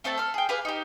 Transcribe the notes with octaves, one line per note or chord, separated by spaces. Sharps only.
A3 C4 A4 A5
A4 F6
G#4 G5
G4 G#4 B4 F5
D#4 G4